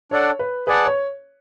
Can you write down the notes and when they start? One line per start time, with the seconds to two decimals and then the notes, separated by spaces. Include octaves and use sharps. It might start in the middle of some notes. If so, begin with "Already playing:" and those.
0.11 D4 A4 C#5 D5 F#5
0.39 B4
0.67 G#4 B4 D5 F#5 A5
0.86 C#5